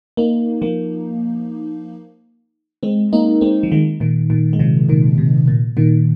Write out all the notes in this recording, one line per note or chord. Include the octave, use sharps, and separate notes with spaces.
A#3 D#4
F3 A#3
G#3 C4
A#3 D#4
G#3 C4
F3
D#3 G#3
A#2 D#3
A#2 D#3
G#3
C3 F3
A#2 D#3
C3
A#2
A#2 D#3